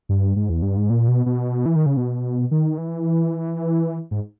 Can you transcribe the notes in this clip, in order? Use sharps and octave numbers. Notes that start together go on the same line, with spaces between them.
G2
G#2
E2
G2
G#2
A#2
B2
B2
E3
D#3
C#3
B2
D#3
E3
G#2